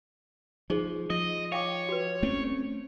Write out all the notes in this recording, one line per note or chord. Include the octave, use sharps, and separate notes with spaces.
F3 D#4 G#4 C5
F3 D#5
C#5 F5 G5 D6
F#4 B4
A3 C4 C#4